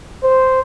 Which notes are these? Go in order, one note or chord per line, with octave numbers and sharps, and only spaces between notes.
C5